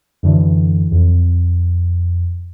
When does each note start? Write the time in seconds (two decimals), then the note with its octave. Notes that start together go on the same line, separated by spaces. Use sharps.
0.23 F#2 D3 E3
0.92 F2